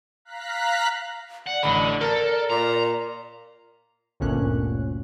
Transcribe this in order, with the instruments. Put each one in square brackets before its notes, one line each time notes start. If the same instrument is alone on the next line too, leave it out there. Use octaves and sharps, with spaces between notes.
[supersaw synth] F5 A#5 F#6 B6
[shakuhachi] D5 [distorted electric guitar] F#5
[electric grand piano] A1 B5 [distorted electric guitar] D3
[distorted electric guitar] A4 [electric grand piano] A#4
[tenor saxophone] A#2 [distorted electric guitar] A#5
[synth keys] G1 D2 A#2 C#4 F#6